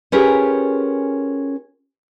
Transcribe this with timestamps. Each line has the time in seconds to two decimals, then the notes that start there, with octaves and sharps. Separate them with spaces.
0.12 C#4 F4 G4 G#4 A#4 B4